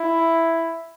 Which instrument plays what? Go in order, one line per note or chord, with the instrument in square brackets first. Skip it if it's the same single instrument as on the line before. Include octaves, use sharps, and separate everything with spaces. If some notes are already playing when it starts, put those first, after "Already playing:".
Already playing: [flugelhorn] E4